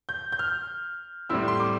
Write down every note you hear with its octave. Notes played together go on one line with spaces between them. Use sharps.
G6
G6
F6
A2 G3 C4 E4 E6
C6
D6